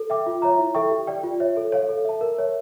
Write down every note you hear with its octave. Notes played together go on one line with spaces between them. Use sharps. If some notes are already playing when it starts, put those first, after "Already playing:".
Already playing: A4
E5 G5 D6
F4
C#5 E5 A#5
E4
A4 E5 G5 C#6
G4
D5 G5
F4
C#5 E5
A4
C#5 F5
A4
E5 A5
A#4
C#5 E5